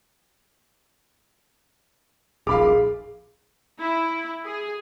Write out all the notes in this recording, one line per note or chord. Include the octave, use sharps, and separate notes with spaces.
D#1 A#1 G#4 F5 B5 D6
E4
G#4